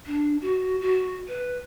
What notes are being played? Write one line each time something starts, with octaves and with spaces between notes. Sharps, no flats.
D4
F#4
F#4
B4